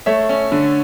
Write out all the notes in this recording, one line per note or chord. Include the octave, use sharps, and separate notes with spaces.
A3 C#5 E5
C#4
D3